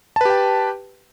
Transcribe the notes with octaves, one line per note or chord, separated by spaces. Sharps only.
G4 B4 G5 A5